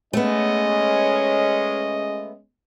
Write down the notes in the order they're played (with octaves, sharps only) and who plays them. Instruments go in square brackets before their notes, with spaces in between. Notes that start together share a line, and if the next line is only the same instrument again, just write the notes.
[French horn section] G#3 C#4 [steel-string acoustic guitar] A3 B3 [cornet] D#5